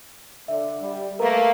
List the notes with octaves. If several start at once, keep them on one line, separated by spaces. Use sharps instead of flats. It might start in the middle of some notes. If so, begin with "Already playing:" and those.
D3 E5
G3
A3 A#3 A#4 B4 A#5